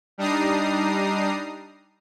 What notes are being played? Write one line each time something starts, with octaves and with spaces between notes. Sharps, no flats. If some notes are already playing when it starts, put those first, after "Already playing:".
G3 D4 D#4 A#5 D#6 C7